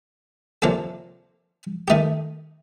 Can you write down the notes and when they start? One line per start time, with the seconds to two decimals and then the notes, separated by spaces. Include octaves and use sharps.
0.62 C3 F3 A#3 D4 A4
1.88 D#3 A3 D#4 G4